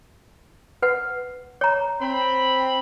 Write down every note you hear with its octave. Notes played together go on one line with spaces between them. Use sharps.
B4 F#5
C#5 A#5
C4 B5